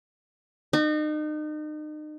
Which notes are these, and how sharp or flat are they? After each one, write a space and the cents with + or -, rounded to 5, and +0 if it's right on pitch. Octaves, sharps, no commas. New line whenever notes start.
D#4 -35